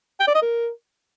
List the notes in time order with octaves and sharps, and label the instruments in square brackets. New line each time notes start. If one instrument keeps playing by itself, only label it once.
[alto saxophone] G5
D5
D#5
A#4